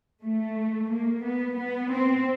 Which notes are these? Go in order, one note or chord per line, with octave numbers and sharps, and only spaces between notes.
A3
A#3
B3
B3
C4